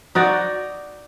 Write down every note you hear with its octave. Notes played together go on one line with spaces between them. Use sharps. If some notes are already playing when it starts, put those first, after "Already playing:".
D#4 F#4 D5